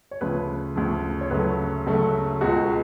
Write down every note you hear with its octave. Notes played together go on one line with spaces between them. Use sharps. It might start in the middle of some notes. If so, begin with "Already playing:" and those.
C#5
D2 C#3 F3 B4
D2 C#3 F3
C#5
D2 C#3 F#3 A3 B4
D2 C#3 F#3 A3
C#2 B2 G#3 F#4